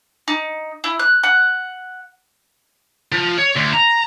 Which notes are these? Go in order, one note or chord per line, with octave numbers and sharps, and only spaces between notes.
D#4
E4
F#6
F#5
F3
C#5
D2
A#5